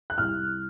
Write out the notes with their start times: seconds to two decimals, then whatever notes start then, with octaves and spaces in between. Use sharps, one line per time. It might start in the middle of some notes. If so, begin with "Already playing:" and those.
0.10 F#6
0.18 C2 F6